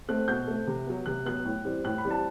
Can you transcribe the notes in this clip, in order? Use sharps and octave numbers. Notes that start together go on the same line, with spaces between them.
A3 C4 F#6
B2 G6
A3 C4
C3
F#3 B3
C3 F#6
F#3 B3 F#6
A2
E3 G3 C4
A2 F#6
B5
E3 G3 C4
A5